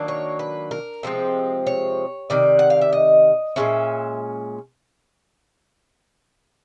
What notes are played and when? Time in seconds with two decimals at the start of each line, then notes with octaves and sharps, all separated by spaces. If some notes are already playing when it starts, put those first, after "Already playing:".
Already playing: D#3 F#3 A#3 D4
0.08 C#5
0.39 B4
0.71 A#4
1.03 C3 F3 G#3 C4
1.67 C#5
2.30 C3 D#3 D5
2.59 F#5
2.70 F5
2.81 E5
2.93 D#5
3.56 A#2 F3 G#3 C#4 E5